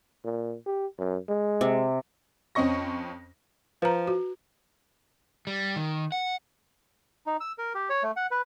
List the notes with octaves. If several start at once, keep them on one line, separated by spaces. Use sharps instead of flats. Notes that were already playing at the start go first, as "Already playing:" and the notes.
A#2
G4
F#2
G#3
C3
F2 C4 C#4 D#5 C#6 A#6
F3 B4 A#5
F#4
G3
D#3
F#5
D#4
E6
A#4
G4
C#5
A3
F#5
B4